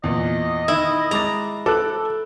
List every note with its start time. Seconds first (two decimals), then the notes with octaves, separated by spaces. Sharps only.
0.04 E2 A#2 D#5
0.68 D#3 E4
1.11 G#3 A#5 D6 A6
1.66 A4 D6 F#6